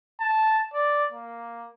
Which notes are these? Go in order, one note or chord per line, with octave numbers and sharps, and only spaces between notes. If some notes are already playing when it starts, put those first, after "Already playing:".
A5
D5
A#3